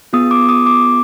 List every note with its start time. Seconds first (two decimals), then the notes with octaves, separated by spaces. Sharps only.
0.13 B3 F4 G#4 D#6
0.31 D6
0.49 D#6
0.66 D6